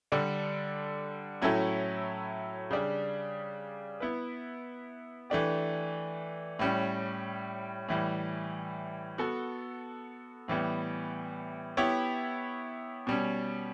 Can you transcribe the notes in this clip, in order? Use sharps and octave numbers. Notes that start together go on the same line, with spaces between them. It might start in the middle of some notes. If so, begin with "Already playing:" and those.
D3 G3 D4 A4 D5
A2 F#3 C#4 E4 A4
C#3 G3 D4
B3 E4 B4
E3 A3 D4 G4
A2 G3 C#4
A2 E3 G3
B3 F#4 A4
A2 E3 G3 B3
B3 E4 G4 C#5
B2 G3 C#4